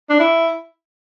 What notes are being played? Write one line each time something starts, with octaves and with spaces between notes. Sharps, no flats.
D4
E4